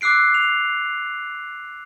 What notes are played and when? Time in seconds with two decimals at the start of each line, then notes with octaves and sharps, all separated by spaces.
0.01 D6 E6 F#6 C7 D7
0.34 F7